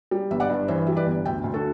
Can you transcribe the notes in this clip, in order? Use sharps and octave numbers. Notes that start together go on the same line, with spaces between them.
G3
G1 E5
D5 F#5
G2
E3 C5 E5
G3 E5
B4 D5
G1
D2 E5 G5
D2
F#4 A4